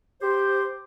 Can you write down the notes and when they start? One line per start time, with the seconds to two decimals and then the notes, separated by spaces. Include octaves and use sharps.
0.21 G4 C5